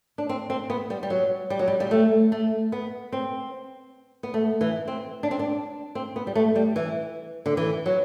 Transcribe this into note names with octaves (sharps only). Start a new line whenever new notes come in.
D4
C4
C4
B3
G3
G3
F#3
G3
F#3
G3
G3
A3
A3
B3
C4
B3
A3
E3
C4
D4
C4
D4
C4
B3
G3
A3
G3
E3
D3
E3
F#3